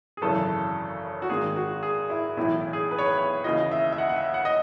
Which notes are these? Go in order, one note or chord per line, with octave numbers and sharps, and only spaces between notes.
G#4
G#1 F#2 C#3 E3 A4
F#4
G#1 G#2 D#3 G#4
F#4
G#4
E4
B1 A2 E3 E4
G#4
B4
C#5
B4
C#5
D#2 C#3 E3 D#5
E5
E5
F#5
F#5
E5
F#5
D#5